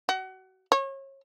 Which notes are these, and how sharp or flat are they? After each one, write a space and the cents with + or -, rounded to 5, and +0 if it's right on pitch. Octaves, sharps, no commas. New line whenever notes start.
F#4 +30
C#5 -30